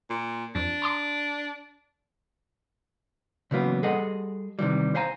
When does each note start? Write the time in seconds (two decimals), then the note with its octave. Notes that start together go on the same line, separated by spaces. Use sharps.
0.10 A#2
0.55 F2 D4
0.82 A#5 C6 D6
3.51 C#3 E3 F#3 A#3 B3
3.83 G3 G#4 A4 D#5 F#5
4.59 C3 D#3 E3 G3
4.95 C5 F5 G#5 A#5